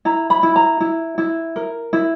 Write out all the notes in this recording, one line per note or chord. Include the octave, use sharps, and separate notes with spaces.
E4 A#5
B5
E4
A#5
E4
E4
A#4
E4